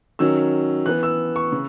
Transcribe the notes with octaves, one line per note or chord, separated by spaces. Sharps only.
D#3 F#3 C#4 E6
E3 B3 F#6
E6
C#6
C#3